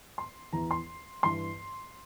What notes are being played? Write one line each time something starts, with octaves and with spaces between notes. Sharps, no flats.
C6
E2 E3 A#5
C6
G2 E3 C6